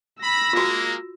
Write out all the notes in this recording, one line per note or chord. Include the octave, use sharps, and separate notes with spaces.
B5 E6 A#6
G#3 A#3 F4 F#4